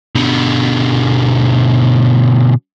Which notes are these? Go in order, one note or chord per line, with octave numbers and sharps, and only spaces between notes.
B2 D3